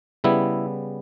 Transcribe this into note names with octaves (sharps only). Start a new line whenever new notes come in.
C#3 G3 B3 E4